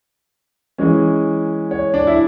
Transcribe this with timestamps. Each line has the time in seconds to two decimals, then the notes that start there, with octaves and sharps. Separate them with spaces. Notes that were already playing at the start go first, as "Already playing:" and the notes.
0.78 E3 G#3 C#4
1.71 C#5
1.94 D4
2.07 E4